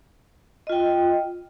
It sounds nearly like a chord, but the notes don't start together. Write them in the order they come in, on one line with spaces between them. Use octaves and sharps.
D#5 F4 G5